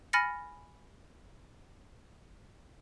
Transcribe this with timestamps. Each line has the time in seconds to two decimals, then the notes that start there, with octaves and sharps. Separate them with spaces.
0.13 G#5 B5 F6 A6 A#6 C#7